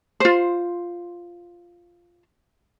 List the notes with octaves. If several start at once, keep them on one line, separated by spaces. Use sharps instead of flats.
F4 C5